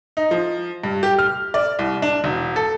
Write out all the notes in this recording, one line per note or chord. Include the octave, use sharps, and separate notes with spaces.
D#4
F3
G2
G4
F6
D5
C2
D4
E1
A4